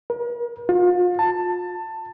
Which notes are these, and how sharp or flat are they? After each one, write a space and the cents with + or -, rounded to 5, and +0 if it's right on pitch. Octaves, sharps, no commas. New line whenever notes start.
A#4 +45
F4 +35
A5 +15